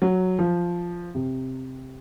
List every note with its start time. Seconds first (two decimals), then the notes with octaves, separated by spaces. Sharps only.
0.02 F#3
0.39 F3
1.15 C3